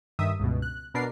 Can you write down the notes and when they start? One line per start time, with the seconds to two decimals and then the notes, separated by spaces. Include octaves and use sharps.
0.19 G2 D#3 E5 D#6
0.40 C#2 G2 B2
0.62 F#6
0.94 B2 D4 A#4 B4 D5 C7